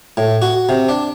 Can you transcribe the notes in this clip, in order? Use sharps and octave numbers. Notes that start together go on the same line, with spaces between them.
A2
F#4
C3
D4